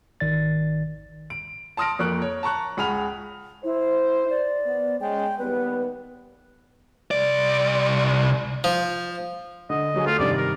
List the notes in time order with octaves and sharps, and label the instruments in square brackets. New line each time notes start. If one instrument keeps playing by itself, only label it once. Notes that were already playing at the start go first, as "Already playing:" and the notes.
[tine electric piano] G#1 D#3 D5 A6
[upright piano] D7
A5 C6 D#6 F6 A#6 D7
F2 A#3 A#4 C#6 F#6
C#5
A5 A#5 C#6 F#6
C#2 G#4 F#5 B5 F6 F7
[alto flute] E4 [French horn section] C5
[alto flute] D5
[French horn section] B3
[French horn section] G#3 C#4 [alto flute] G5
[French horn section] D#2 G3 B3 [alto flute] B4
[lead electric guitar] C2 D5
[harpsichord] F3
[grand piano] D3 [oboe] D#5
[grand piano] D3 F#3 G#4
[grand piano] A3 [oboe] F4
[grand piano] G2 C3 D#3 [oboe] D5
[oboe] A#4